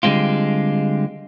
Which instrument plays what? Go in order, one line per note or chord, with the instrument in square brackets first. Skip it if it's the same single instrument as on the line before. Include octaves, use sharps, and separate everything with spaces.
[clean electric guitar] D3 G3 G#3 C4 F4